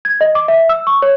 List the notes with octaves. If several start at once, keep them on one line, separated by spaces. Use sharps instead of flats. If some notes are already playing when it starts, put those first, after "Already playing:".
G#6
D#5
D6
E5
E6
C#6
C#5